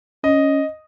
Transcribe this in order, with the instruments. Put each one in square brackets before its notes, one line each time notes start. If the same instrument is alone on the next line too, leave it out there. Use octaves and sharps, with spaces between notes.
[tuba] C#4 [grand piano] D#5